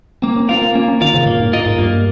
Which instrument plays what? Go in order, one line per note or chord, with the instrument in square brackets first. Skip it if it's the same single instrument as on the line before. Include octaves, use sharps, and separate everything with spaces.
[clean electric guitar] A#3 [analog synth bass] C4
[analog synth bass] C#4
[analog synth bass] C4 [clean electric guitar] F4 A#4 F5
[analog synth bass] A#3
[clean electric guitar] A#3 [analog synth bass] C#4
[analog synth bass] C#4
[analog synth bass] D#3 [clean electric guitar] F4 A#4 F5
[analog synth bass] C#3
[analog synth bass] A#2 [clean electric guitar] A#3
[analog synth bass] G#2
[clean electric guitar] F4 A#4 D#5
[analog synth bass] G#2
[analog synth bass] G2 [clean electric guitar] A#3